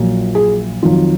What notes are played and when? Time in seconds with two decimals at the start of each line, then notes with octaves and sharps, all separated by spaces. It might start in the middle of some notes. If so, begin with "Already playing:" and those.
Already playing: A#1 A#2 F#3
0.35 G#4
0.83 F2 D#3 F#3 F4